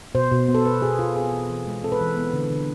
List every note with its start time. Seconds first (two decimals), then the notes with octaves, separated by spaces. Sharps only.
0.15 B2 C5
0.31 B2
0.48 B3
0.55 A4
0.65 B3 B4
0.82 B2 G#4
0.99 B2 F4
1.16 C4 G#4
1.32 E3
1.49 E3
1.67 G#3
1.83 C4 A4
1.92 B4
2.01 E3
2.17 B3
2.33 D3
2.51 D3